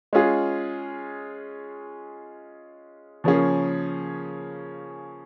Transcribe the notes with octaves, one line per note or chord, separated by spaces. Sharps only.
G#3 C#4 F4 G#4
C#3 F3 A#3 C#4 G#4